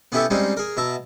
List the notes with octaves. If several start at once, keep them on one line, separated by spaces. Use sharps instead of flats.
B3 C#4 E4 G4 A4 E5
G3 G#3 C4 C#4 D#4
G#4 A#4
B2 E5 A5 A#5